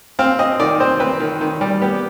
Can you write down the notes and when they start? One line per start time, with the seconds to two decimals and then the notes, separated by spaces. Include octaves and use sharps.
0.19 C4 F5
0.39 C4 D#5
0.60 D#3 D5
0.80 C4 C5
1.00 C4 B4
1.20 D#3
1.41 D#3
1.61 G3
1.82 B3 G4